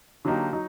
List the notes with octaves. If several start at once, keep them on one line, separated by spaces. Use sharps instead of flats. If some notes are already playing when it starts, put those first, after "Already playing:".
D3 F#3 A#3 D#4 G4
F#3 D#4